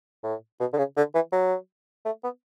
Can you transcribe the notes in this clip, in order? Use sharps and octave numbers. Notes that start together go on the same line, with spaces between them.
A2
B2
D3
C#3
D3
E3
F#3
A3
B3